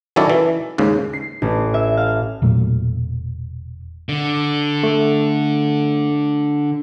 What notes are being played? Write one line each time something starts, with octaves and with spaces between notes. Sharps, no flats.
D#3 F#3 C#4 E4 A4 D5
E3
D#2 G#2 C#3
C7
A1
E5
F5
E1 A#2 F#3 A3
D3
A3